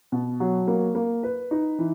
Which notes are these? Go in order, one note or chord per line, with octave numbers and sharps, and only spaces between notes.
B2
F#3
A#3
A#3
B4
D#4
E3